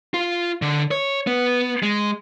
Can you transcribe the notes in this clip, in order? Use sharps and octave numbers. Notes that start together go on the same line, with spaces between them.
F4
D3
C#5
B3
G#3